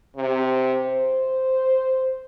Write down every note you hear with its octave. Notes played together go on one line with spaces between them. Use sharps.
C3
C5